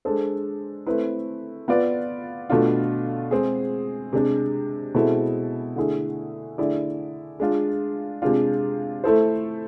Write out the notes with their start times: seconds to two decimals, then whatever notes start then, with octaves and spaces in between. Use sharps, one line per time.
0.05 G#3 D4 A4 C5
0.87 A3 C4 E4 B4
1.68 B3 F4 B4 D5
2.50 B2 A3 D4 F4
3.31 G#3 C4 G#4
4.13 C3 G#3 D4
4.94 B2 G#3 C4 E4 A4
5.76 D3 A3 E4 G#4
6.58 D3 A3 E4 G#4 D5
7.40 G#3 D4 F4
8.22 C3 G#3 D4 F4
9.04 A3 E4 A4 C5